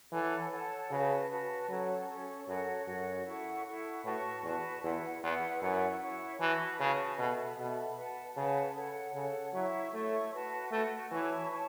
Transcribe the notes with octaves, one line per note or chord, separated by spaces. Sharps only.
E3 A4 C#5 F#5 A5
A4 C#5 F#5 A5
C#3 F#4 B4 A5
F#4 B4 A5
F#3 C#4 A4 C#5
C#4 A4 C#5
F#2 F#4 A4 C#5 F#5
F#2 F#4 A4 C#5 F#5
E4 A4 F#5 C#6
E4 A4 F#5 C#6
A2 F#4 B4 A5 C#6
E2 F#4 B4 A5 C#6
E2 E4 B4 F#5
E2 E4 B4 F#5
F#2 E4 C#5 F#5 C#6
E4 C#5 F#5 C#6
E3 F#4 B4 A5 C#6
C#3 F#4 B4 A5 C#6
B2 A4 E5 B5
B2 A4 E5 B5
B4 F#5 A5
C#3 B4 F#5 A5
A4 C#5 F#5
C#3 A4 C#5 F#5
F#3 E4 C#5 E5 C#6
A3 E4 C#5 E5 C#6
F#4 B4 F#5 A5
A3 F#4 B4 F#5 A5
E3 E4 C#5 A5 C#6
E4 C#5 A5 C#6